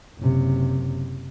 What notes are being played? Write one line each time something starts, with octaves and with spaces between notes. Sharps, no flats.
F#1 C3